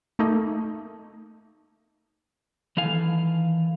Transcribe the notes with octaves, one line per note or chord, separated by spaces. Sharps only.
A3 A#3 D#4
D#3 E3 A4 F5 G#5